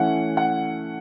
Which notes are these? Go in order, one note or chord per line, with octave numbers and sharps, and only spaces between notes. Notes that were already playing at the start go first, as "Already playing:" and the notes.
Already playing: E3 A3 C#4 E4 F#5
F#5